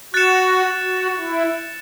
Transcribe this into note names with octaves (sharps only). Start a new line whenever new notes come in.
F#4 F#6 A6 C#7 E7
F#4
E4